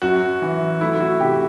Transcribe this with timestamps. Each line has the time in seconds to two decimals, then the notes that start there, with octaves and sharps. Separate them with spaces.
0.02 F#2 F#4
0.42 E3
0.81 A3 E4
0.95 E4
1.00 F#4
1.20 C3 G4